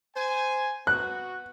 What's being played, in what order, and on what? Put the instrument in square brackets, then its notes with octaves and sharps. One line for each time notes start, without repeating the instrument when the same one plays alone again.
[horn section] C5 G#5
[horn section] B3 F#4 [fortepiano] F#6